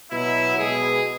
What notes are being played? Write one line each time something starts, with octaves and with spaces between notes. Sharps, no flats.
B2 F#3 E4
B2 G#3 G#4